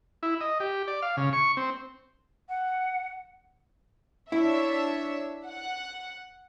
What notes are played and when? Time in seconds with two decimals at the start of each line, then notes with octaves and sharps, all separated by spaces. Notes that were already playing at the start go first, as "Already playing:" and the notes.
0.23 E4
0.41 D#5
0.60 G4
0.88 D5
1.02 F5
1.17 C#3
1.33 C#6
1.57 C4
2.49 F#5
4.32 D4 E4 C#5 E5
5.46 F#5